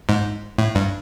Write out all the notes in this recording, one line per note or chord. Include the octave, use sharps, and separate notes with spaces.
G#2
A2
G2